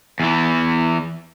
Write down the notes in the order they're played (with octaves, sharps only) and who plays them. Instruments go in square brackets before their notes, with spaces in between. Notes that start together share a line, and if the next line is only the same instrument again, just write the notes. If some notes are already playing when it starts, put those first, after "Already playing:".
[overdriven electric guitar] E2 E3